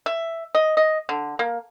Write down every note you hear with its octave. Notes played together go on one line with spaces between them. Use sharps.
E5
D#5
D#5
D3
A#3